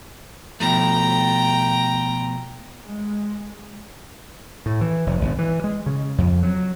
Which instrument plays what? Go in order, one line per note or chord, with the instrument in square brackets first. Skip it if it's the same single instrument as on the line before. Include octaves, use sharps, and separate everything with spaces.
[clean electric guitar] B2 F3 A3 [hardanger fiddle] G5 A#5
[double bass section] G#3
[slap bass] A2
E3
F1
G1
E3
G#3
C#3
F2
F#3